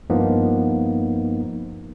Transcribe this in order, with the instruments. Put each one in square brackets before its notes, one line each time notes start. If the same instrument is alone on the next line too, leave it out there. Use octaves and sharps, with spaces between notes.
[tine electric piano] G2 F3 A#3 B3 D#4